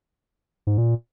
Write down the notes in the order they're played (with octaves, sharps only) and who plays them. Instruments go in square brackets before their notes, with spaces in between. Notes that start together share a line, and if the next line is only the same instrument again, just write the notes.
[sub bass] G#2
A#2